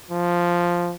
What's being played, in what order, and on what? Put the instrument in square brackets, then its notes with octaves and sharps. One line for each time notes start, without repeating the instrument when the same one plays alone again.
[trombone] F3